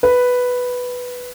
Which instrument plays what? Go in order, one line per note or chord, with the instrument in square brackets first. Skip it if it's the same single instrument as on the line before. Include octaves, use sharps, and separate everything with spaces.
[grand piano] B4